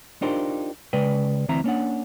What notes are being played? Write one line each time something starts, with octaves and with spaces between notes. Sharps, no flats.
D4 D#4 F4 G4 A#4 C5
C#3 G#3 B4 D5 G5
D2 E3 C4 E4 A#5
A#3 C#4 D4 F#5